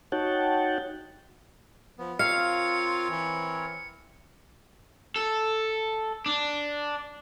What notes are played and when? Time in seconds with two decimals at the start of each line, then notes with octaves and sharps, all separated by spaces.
0.12 D#4 F#4 C#5 F#5 G5 A5
1.98 F3 B3
2.19 C4 F4 A#4 C#5 F5 C#7
3.10 E3
5.16 A4
6.26 D4